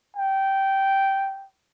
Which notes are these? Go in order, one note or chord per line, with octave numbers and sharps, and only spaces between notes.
G5